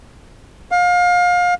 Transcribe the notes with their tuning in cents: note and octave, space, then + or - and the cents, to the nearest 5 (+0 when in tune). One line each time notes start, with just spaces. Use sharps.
F5 +30